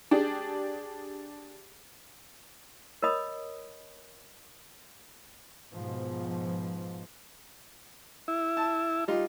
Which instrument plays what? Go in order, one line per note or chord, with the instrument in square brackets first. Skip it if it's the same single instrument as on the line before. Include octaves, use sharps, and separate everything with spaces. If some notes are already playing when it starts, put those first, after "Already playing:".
[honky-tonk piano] D4 G4 G#4
[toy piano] A#4 C#5 D#5 B5 D#6
[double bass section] G#2 B2 F3
[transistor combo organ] E4
[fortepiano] A5
G3 D#4 F4